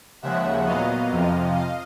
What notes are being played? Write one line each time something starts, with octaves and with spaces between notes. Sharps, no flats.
D#2 C#3 F3 G#3 E5 F#5
A#2 F#3 B3 D#5 F5
F2 C3 F3
D#5 F5